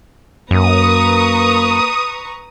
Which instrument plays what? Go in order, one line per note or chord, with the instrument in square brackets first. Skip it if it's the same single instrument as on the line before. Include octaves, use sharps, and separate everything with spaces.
[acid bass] F#2 [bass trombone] A#3 [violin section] B4 A#5 C#6 [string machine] D#6